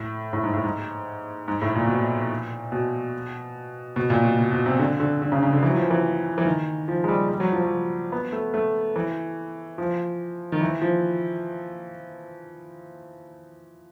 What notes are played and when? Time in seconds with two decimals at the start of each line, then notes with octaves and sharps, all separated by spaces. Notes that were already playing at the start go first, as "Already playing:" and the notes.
Already playing: A2
0.33 A2
0.43 G#2
0.54 A2
0.63 G#2
1.48 G#2
1.62 A2
1.76 A#2
1.86 B2
1.97 A#2
2.72 B2
3.96 B2
4.10 A#2
4.24 B2
4.39 B2
4.51 B2
4.66 C3
4.79 D3
5.00 D3
5.22 D3
5.32 C#3
5.43 C#3
5.53 D3
5.63 E3
5.69 F#3
5.76 F3
5.91 E3
6.38 E3
6.45 D#3
6.88 F3
7.04 G#3
7.08 G3
7.29 G3
7.40 F#3
7.52 F3
7.63 F#3
8.12 B3
8.32 A3
8.54 A3
8.96 E3
9.78 F3
10.52 D#3
10.61 E3
10.82 F3